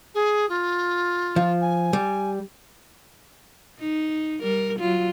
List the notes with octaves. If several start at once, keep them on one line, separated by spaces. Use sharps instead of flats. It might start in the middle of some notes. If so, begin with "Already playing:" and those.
G#4
F4
F3
G#5
G3
D#4
G3 A#4
F#3 F4